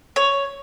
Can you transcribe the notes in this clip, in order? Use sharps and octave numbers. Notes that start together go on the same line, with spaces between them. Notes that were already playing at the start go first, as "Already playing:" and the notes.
C#5